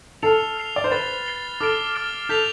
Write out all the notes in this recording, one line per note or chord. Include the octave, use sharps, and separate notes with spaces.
A4 F6 C7 F7
F6 C7 F7
D5
C5
B4 A6 C7 G7
A6 C7 G7
A4 D6 F6 A6 D7
D6 F6 A6 D7
A4 G6 B6 F7